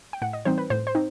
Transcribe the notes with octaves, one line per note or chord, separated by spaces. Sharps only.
G5
A2 F#5
D#5
E3 G3 C4 D#4 C5
B4
A2 C5
C5
C4 D#4